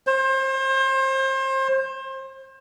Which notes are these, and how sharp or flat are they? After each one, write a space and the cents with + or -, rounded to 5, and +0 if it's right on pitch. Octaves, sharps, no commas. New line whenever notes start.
C5 +30